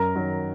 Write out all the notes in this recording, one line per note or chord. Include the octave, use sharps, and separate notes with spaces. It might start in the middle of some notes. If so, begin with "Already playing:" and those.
Already playing: F#2 A#4 A#5
D#3 F#3